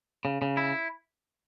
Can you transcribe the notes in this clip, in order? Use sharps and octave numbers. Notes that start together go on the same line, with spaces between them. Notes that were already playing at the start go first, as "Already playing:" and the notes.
C#3
C#3
E4